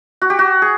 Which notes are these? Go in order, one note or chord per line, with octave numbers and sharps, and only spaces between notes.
F#4
G4
F#4
G#4